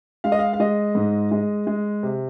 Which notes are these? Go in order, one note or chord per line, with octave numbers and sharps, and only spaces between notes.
G#3 F5
D#5
F5
F5
G#3 D#5
G#2
G#3
G#3
C3